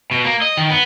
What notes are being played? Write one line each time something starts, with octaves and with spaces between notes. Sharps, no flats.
B2
A#3
D#5
D#3
B3